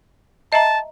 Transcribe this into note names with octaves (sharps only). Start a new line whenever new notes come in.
D#5 E5 A5 A#5